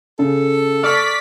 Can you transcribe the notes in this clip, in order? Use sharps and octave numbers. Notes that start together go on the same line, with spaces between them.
C#3 A4
D5 C#6 F6 B6